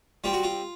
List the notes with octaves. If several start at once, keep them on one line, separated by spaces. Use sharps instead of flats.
G3 C4 F4
F#4
F4